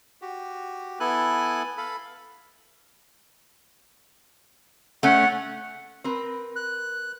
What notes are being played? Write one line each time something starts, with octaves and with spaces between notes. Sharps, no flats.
F#4 G4
B3 E4 A4 G#5 F#6
A4 F5 B5
A3 C#4 F#5
C4 A#4 B4
F#6